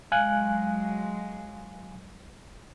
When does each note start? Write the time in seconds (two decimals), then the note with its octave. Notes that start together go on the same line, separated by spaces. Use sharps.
0.12 F#3 G#3 F5 G#5 F#6